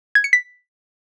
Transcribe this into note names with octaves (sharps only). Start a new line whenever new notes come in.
G#6
C#7
B6